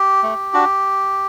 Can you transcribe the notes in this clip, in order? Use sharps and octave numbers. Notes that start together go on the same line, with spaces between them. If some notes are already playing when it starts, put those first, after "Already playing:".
Already playing: G4
A3
D4 F#4